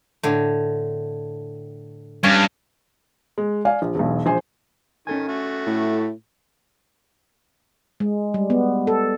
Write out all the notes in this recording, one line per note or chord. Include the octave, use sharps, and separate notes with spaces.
A2 D3
G2 C#4
G#3
D5 F5 G#5
A#1
E1 B1
A#1 C5 G#5
D#3 C#4 A4 G#5
A3 F#4
A2
G#3
G3
B3
A4